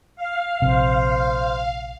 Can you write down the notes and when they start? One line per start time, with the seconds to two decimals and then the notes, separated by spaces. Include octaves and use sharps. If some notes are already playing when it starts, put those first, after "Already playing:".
0.16 F5
0.62 A#1 C3 C5